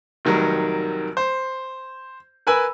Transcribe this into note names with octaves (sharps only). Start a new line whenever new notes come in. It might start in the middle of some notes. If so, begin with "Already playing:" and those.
F1 D#3 F#3 G3 A#4
C5
A#4 B4 G#5 B5 E6